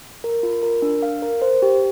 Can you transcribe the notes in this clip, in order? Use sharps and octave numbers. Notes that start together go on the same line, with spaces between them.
A#4
F4
A#4
D4
F5
A#4
C5
G4